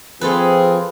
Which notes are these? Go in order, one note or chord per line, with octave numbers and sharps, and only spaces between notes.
F3 C4 F4 G#4 A4 B4